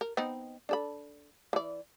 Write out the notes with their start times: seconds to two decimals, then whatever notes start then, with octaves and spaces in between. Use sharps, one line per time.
0.01 A#4
0.17 B3 C4 D#4
0.69 D4 A4 B5
1.53 E3 D5